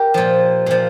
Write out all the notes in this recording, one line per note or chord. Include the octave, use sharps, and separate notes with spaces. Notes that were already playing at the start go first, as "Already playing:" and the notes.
Already playing: G4 A#4
A#2 F3
A#2 F3